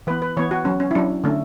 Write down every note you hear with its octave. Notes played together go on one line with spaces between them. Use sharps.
E3 B3 B4
B4
E3 B3 C#5
F#4
F#3 C#4
C#4
E4
F#3 C#4 D4
D3 A3 C#4